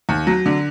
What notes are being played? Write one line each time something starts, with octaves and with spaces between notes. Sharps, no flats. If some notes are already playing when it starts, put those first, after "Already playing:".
D#2
F#3
D3